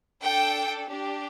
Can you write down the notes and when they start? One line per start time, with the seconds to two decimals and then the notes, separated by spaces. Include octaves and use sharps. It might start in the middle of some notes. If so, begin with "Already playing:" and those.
0.22 D4 A4 G5
0.89 D4 G4